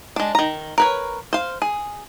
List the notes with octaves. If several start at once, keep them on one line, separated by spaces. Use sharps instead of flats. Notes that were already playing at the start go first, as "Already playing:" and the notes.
G#3 D4
D#3 A#5
A#4 B4 C#5
C5 F5
G#4